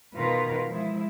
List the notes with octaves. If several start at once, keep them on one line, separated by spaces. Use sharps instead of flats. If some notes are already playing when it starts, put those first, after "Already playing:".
B2 D#3 F4 A#4 B4
F3 G#3 E4